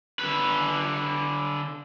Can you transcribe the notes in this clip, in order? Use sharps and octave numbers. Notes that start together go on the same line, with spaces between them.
D3 B4